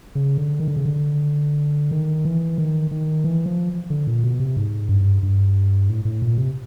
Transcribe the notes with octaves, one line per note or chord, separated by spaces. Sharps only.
C#3
D3
D#3
D3
C#3
D3
D#3
E3
D#3
D#3
E3
F3
D3
A#2
B2
C3
G#2
G2
G2
A2
A2
A#2
C3